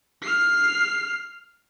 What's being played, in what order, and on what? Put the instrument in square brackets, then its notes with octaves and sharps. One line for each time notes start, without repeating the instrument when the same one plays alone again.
[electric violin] F6 C7